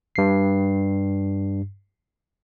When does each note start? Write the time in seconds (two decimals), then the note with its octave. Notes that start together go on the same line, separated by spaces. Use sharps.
0.16 G2 C7